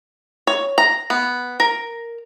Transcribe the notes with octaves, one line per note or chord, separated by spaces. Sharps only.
C#5
A#5
B3
A#4